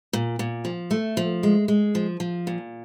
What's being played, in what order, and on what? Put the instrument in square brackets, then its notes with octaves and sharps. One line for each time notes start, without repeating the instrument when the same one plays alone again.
[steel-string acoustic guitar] A#2
A#2
F3
A3
F3
G#3
G#3
F3
F3
A#2